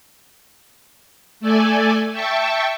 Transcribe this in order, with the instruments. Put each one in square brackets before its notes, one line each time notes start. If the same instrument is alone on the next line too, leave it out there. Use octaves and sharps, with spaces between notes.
[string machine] A3 A4 D5 G#5
E5 G5 A5 C#6